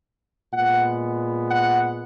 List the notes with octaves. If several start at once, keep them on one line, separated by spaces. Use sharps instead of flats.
A#2 G#3 B3 F#5
F#5